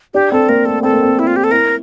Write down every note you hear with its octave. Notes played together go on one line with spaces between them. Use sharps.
D4 G4
C4 A4
A#3 A#4
A3 A4
C4 A4
A#3
C4
E4
F4
G4
A4
E4 A#4